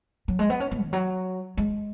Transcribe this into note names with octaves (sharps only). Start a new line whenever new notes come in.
F#3
G#3
B3
C#4
B3
D#3
F#3
G#3